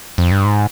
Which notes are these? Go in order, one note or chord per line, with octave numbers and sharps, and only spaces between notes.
F2
G2
G#2